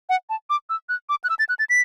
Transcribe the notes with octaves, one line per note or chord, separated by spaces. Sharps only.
F#5
A5
D6
E6
F#6
D6
F#6
E6
A6
F#6
A6
B6